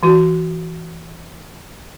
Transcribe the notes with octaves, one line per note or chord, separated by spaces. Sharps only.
E3 F#4